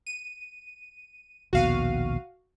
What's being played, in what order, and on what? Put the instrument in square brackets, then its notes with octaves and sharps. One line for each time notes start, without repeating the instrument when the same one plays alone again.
[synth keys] D#7
[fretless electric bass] A#1 D#2 B2 [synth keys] F#4 F5 D#7